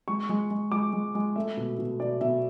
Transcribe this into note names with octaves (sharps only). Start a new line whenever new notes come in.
G#3 C#6
G#3
G#3
G#3 D6
G#3
G#3
A3 E5
B2
B2
B2 D5
B2 E5